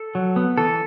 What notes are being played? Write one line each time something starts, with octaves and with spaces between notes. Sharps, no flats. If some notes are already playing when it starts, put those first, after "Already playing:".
Already playing: A4
F#3
B3
E3 A4